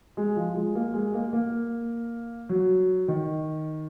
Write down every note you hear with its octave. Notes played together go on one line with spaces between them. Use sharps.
G#3
F3
G#3
A#3
G#3
A#3
A#3
F#3
D#3